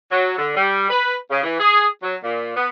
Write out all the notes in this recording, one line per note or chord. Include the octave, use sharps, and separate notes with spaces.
F#3
D3
G3
B4
C#3
E3
G#4
F#3
A#2
B3